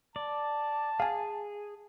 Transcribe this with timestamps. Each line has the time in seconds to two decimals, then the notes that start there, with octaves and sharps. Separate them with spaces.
0.16 D5 A5
1.00 G#4 F5 G#5